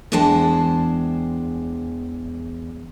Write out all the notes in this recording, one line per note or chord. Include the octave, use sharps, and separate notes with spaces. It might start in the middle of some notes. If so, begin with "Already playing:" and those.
E2 G#3 D4 C5 G5 A5